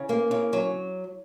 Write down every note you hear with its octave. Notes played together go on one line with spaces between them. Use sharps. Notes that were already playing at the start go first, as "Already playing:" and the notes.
Already playing: C#3
A#3
C#3
F#3